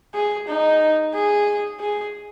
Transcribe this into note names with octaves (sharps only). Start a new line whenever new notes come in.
G#4
D#4
G#4
G#4